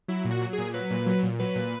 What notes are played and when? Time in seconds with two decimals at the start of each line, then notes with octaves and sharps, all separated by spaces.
0.08 F#3 E4
0.25 A#2
0.31 F#4
0.41 F#3
0.53 G#4
0.58 A#2
0.74 F#3 B4
0.91 A#2
1.06 F#3
1.23 A#2
1.39 F#3 B4
1.56 A#2